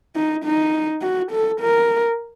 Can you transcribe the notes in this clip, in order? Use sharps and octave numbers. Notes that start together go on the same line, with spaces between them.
D#4
D#4
F#4
A4
A#4